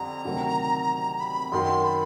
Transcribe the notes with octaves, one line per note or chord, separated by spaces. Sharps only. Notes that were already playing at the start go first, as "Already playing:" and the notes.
Already playing: F2 D3 G3 A#5
D2 C3 D#3 F#3
B5
F#2 D#3 F#3 C6
B5